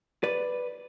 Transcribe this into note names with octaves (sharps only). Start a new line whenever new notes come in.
B4 D5